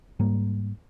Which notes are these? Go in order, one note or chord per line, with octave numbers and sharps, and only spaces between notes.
G#2 G3 A#3